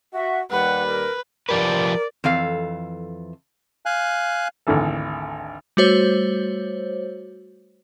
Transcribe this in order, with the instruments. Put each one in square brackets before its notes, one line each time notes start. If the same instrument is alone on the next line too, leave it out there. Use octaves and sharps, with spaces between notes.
[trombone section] F#4 [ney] E5
[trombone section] D#2 G3 [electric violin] B4 [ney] F#5
[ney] A#4
[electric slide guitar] F3 G4 B4 [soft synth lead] A#4 [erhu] D5
[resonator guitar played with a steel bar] F2 E3 A4 F5
[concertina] F5 G#5 F#6
[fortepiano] G#1 D2 D3 E3 A4
[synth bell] G3 A3 F#4 C5 C#5